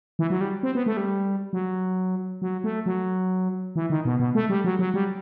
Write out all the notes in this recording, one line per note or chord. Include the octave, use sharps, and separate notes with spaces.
E3
F#3
G3
C4
B3
A3
G3
F#3
F#3
A3
F#3
E3
D#3
B2
B2
A3
G3
F#3
F#3
G3